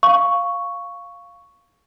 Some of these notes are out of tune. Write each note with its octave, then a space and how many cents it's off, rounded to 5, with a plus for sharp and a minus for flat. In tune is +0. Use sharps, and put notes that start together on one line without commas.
F5 +0 C#6 +5